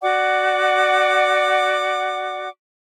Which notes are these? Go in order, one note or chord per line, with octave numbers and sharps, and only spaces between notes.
F#4 D5 F#5 D6